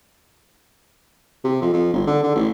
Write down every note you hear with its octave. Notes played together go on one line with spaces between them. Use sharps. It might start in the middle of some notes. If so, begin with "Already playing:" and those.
C3
F2
F2
G1
D3
D3
A1